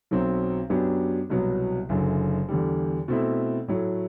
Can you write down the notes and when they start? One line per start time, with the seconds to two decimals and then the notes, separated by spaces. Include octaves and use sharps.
0.11 B1 B2 F#3 C4
0.70 F#2 F#3 B3 D4 G4
1.30 C2 B2 F#3 B3
1.89 F#1 F#2 D3
2.49 E2 D3 G3
3.08 B2 A3 C4 E4
3.68 A2 F#3 A3